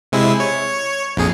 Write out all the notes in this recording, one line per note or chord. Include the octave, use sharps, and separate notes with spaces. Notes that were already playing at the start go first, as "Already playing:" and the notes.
C3 G#3 E4
C#5
A#1 F2 G#4